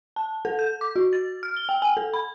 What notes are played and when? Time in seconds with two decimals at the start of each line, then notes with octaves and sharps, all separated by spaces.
0.16 A5
0.45 A4
0.59 G6
0.81 D6
0.96 F#4
1.13 A6
1.43 F6
1.57 G7
1.69 G5
1.82 G#5
1.97 A4
2.14 B5